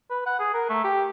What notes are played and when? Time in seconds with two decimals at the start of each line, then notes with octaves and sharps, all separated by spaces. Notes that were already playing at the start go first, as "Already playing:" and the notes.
0.10 B4
0.26 F#5
0.40 G#4
0.54 A#4
0.70 A3
0.84 G4